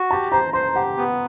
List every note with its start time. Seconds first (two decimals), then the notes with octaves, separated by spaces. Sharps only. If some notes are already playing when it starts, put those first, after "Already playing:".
Already playing: F#4
0.11 G4 A5
0.32 C5 A#5
0.53 C5 C6
0.75 G4 F#5
0.97 B3